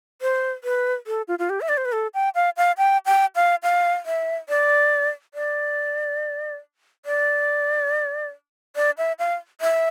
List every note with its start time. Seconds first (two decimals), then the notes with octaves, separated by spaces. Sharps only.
0.22 C5
0.64 B4
1.07 A4
1.28 F4
1.39 F4
1.50 G4
1.61 E5
1.69 D5
1.77 C5
1.85 B4
1.92 A4
2.14 G5
2.35 F5
2.57 F5
2.78 G5
3.06 G5
3.36 F5
3.63 F5
4.06 E5
4.49 D5
5.34 D5
7.06 D5
8.76 D5
8.98 E5
9.19 F5
9.61 E5